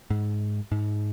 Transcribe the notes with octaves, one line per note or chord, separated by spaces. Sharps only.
G#2
G#2